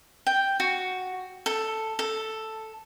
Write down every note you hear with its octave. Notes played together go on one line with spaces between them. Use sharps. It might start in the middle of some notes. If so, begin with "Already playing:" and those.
G5
F#4
A4
A4